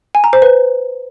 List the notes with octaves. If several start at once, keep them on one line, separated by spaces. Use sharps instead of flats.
G#5
A#5
C5
B4